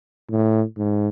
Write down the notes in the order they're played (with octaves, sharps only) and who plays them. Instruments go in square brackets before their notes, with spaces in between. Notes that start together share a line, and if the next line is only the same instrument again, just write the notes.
[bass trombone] A2
G#2